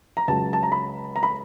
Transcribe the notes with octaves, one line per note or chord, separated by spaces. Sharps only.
A#5
C#2 C#3 F#3 A5
A5
A#5
B5
A#5
B5